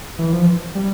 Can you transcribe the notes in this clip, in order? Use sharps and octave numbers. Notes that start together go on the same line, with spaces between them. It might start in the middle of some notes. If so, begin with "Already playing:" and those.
E3
F3
G3